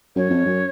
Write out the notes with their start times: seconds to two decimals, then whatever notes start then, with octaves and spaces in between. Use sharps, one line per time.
0.16 F#2 C#5
0.31 F2
0.46 F#2